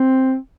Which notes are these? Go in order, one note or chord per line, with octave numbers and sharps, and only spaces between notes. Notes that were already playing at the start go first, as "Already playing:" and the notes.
Already playing: C4